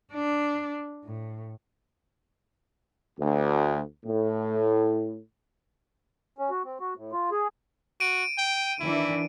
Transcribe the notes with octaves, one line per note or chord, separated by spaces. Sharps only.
D4
A2
D2
A2
C#4
F#4
C4
F#4
A2
F4
G#4
F#4 D7 D#7
G5
D#3 E3 D4 E4